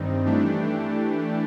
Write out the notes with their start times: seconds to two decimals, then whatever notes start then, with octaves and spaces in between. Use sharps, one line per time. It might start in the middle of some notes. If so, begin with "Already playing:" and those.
Already playing: G2 D#3 G3 C4 D#4
0.25 E3 A3 D4 G4